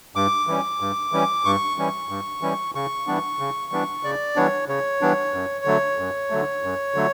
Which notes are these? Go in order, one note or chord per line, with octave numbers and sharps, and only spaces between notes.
G2 D6
E3 G3 C#4
G2
E3 G3 C#4
G2 C#6
E3 G3 C#4
G2
E3 G3 C#4
C#3 C#6
E3 G3 B3 D4
C#3
E3 G3 B3 D4
C#3 D5
E3 G3 B3 D4 C#5
C#3 C#5
E3 G3 B3 D4
F#2
D3 F#3 A3
F#2
D3 F#3 A3
F#2
D3 F#3 A3